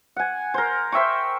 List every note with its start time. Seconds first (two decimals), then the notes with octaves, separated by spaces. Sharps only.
0.16 F#5 G#5
0.54 A#4 C5
0.92 C5 E5 G5 C#6